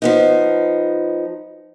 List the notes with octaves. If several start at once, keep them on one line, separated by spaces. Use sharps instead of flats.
F3 B3 D#4